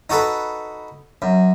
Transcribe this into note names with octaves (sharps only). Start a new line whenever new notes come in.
D#4 F#4 A4 B4
F#2